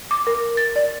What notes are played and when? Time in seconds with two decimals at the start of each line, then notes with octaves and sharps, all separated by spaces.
0.11 D6
0.27 A#4
0.57 A6
0.76 D5